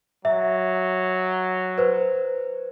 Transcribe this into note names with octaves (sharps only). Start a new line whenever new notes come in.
F#3 E5
B4 C5